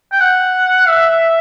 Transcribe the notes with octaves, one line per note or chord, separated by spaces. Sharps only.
G5
F#5
E5